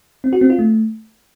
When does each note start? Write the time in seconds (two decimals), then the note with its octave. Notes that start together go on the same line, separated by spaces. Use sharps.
0.24 C4
0.33 F#4
0.41 C4
0.50 F4
0.59 A3